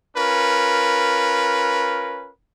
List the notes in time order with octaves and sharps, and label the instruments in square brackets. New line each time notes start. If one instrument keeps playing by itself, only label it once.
[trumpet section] C#4 F4 A#4 B4